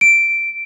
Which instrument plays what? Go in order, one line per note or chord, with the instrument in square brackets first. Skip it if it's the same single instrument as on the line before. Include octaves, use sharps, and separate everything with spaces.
[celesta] D7